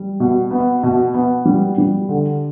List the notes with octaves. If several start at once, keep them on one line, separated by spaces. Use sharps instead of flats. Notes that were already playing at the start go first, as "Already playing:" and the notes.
Already playing: G3
B2
B3
B2
B3
G3
G3
D3